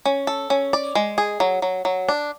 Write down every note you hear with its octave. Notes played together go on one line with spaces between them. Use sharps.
C#4
A4
C#4
D5
G#3
G#4
F#3
F#3
F#3
D4